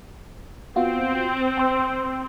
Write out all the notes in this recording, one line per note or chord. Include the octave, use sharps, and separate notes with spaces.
B3 C4 F4 F#4
G5 C6 E6